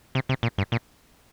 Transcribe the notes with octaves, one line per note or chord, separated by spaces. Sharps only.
C3
C3
A#2
G2
A#2